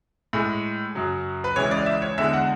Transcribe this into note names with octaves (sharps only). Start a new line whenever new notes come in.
A2 G#3
F#2 C#3 F#3
B4
C#2 C#3 E3 G#3 C#5
D5
E5
C#5
E2 D3 G#3 E5
F#5